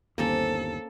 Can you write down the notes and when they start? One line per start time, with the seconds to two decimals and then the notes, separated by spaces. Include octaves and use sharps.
0.18 G1 D#2 A#3 C4 C#4 A4